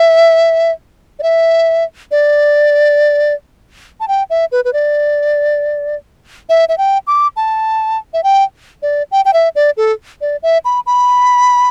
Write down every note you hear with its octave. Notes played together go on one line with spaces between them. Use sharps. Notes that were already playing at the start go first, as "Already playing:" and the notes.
Already playing: E5
D5
E5
D5
A5
G5
E5
B4
B4
D5
E5
E5
G5
D6
A5
E5
G5
D5
G5
G5
E5
D5
A4
D5
E5
B5
B5